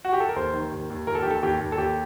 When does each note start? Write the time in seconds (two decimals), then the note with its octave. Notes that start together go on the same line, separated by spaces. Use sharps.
0.05 F#4
0.13 G4
0.20 A4
0.29 A#4
0.36 D#2 C5
0.54 D#3
0.71 D#2
0.90 D#2
1.07 D#2 A#4
1.15 A4
1.23 D#3 G4
1.31 A4
1.43 D#2 G4
1.60 D#2
1.72 A4
1.78 D#2 G4